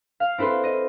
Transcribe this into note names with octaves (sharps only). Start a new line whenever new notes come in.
F5
C4 E4 A4 B4 C6
D#5